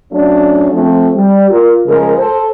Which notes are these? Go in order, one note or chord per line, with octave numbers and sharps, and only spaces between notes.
F#3 A3 C#4 D4
F3 A3 C4
G3
F4 A#4
C#3 F3 G#3 A#4
A4 C5